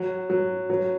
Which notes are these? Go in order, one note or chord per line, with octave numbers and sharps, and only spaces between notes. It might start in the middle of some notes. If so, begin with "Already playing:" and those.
Already playing: F#3
F#3
F#3